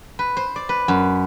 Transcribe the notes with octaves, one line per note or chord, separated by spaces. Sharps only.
B4
C5
D5
B4
F#2